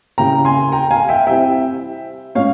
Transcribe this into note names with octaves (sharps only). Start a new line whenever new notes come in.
C#3 G3 A#3 E4 G5 A#5
G#5 C6
G5 A#5
F5 G#5
E5 G5
C3 G3 C4 E4 E5 G5
A#2 G#3 C#4 C#5 F5